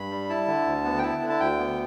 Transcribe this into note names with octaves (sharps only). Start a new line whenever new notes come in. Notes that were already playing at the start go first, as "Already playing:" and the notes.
Already playing: G2 B5
G3
E4 A5
D3
D2
B3
G5
E4 A5
D3
A5
D2 G5
B3